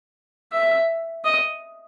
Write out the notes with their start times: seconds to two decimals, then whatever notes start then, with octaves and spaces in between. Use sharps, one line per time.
0.52 E5
1.25 D#5